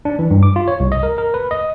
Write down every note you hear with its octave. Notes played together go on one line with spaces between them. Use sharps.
D4
E3
G2
D6
F4
C#5
C2
D#5
A#4
A#4
B4
D#5